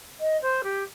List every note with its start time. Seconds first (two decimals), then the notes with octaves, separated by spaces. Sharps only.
0.20 D#5
0.42 C5
0.63 G4